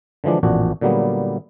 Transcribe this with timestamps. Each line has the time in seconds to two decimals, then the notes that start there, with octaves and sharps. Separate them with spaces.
0.24 D3 E3 F3 G#3 D4
0.43 A1 F2 A#2 D4 F#4
0.81 A#2 D3 F#3 G3 A#3 B3